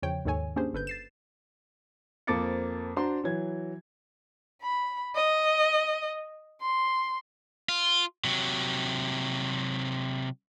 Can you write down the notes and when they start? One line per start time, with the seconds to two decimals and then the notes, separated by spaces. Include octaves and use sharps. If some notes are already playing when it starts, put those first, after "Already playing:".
0.03 E2 C#3 F3 C#5 G5
0.25 D#2 G#2 D#3 A4 C#5 G#5
0.56 A#3 C#4 D4 G4 G#4 C5
0.73 G1 A4 B4 G6
0.87 A6 C7 E7
2.27 F2 A#3 C4 D6 A6 C#7
2.97 D4 F#4 C5 A#5 C6
3.24 E3 F#3 G#6
4.62 B5
5.15 D#5
6.61 C6
7.69 F4
8.24 C3 F#3